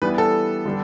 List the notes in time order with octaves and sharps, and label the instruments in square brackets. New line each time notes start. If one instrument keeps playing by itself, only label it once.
[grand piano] E3 G3 B3 D4 [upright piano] B4
[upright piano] A4
[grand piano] D3 G3 D4